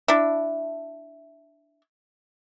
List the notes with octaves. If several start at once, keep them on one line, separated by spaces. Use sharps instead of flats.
D4 E4